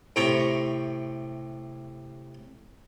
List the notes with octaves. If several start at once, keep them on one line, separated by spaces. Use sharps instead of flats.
A2 C3 G5 A#5 C#6